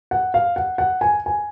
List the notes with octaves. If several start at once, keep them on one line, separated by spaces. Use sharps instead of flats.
F#5
F5
F#5
F#5
G#5
G#5